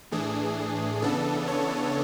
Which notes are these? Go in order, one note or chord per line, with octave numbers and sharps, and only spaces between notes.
A2 E3 A3 D4 G#4
C#3 E3 B3 D4 A4
C#5